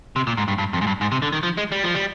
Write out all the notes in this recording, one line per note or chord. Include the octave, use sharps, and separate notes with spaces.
C3
A#2
G#2
G2
G2
F2
G#2
G2
G#2
C3
D3
D#3
F3
G#3
G3
F3
G3